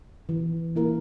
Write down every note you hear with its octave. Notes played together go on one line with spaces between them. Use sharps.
E3
A#3 E4 A#4